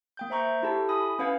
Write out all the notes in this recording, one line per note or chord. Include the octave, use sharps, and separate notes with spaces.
A#3 G5 G6
C5 E5 A#5 C#6 G6
E4 G4 A4 A5
E4 G#5 B5 D#6
C#4 B4 F5 F#5 G#6